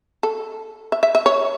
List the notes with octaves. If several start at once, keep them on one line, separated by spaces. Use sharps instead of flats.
A4
E5
E5
E5
C#5